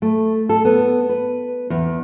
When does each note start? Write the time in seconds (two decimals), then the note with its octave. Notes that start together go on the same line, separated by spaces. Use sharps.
0.02 A3
0.49 A4
0.65 B3
1.09 B4
1.70 E2